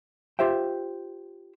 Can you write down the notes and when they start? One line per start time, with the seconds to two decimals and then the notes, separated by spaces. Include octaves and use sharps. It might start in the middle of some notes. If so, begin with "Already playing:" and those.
0.39 F4 G4 C5 E5 G5